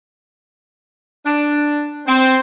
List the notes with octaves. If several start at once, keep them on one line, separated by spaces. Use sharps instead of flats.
D4
C4 C5